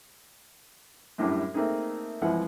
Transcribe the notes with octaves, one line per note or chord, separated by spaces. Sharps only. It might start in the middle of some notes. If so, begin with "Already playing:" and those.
F#2 A2 D3 F#3 G3
A3 A#3 C4 D#4 G#4
C2 E3 F3 G#3 F#5